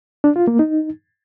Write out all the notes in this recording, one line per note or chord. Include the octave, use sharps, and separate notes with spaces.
D4
F4
A#3
D#4